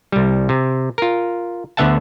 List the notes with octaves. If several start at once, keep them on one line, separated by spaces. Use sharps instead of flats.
C2 G3
C3
F4 A#4
D2 D3 B3 E5 F#5 A5